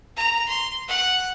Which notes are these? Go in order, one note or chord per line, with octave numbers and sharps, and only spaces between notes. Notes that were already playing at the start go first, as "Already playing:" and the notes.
A#5
C6
F#5